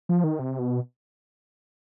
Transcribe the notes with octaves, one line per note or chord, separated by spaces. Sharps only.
F3
D#3
C3
B2